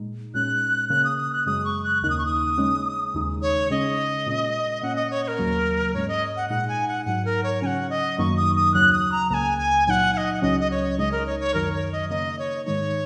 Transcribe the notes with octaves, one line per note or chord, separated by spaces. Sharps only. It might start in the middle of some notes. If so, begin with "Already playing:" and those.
Already playing: A#2 G#3 D#4
A#2 G#3 C#4 F#6
C#3 A#3 C#4 F#6
D#6
D#6
F#6
F#2 C#3 G#3 D#6
C#6
F#6
D#2 C#3 A#3 D#4 F#6
D#6
C#6
D#6
C#3 G#3 C#4
D#2 C#3 G#3 D#4
C#5
C#3 G#3 C#4 D#5
A#2 G#3 C#4
A#2 A#3 C#4 F#5
D#5
C#5
C#5
A#4
D#2 C#3 F#3 A#3
G#2 G#3 C#4 C#5
D#5
F#5
A#2 G#3 D#4 F#5
G#5
F#5
G#2 F#3 D#4 F#5
A#4
C#5
C#3 F#3 C#4 F#5 G#5
D#5
F#2 D#3 F#3 A#3 D#4 C#6
D#6
D#6
D#2 C#3 F#3 F#6
D#6
A#5
C#2 C#3 A#3 G#5 A#5
G#5
A#2 F#3 D#4 F#5 G#5
F#5
D#5
F#5
C#2 C#3 F#3 C#4 D#5
D#5
C#5
C#2 C#3 G#3 D#4 D#5
A#4
C#5
C#5
F#2 D#3 F#3 D#4 A#4
C#5
D#5
C#3 A#3 D#4 D#5
C#5
G#2 D#3 G#3 D#4 C#5